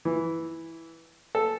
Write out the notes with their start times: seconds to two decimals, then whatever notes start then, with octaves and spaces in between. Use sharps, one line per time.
0.05 E3
1.35 A4